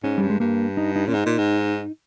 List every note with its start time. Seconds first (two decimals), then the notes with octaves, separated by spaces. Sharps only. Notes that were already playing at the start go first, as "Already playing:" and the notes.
0.03 G#2 C#4
0.18 G2 G3
0.30 G#3
0.40 G2 A#3
0.77 D#4
0.96 D#4
1.08 A#2 C#4
1.14 G#2 D#4
1.26 A#2
1.39 G#2